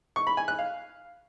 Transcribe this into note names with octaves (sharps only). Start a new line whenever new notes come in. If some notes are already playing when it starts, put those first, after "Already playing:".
C#6
B5
G#5
F#6
F5